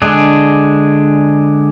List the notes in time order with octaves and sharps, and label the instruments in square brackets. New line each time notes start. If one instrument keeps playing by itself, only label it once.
[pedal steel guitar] D3 G#3 D4 G#4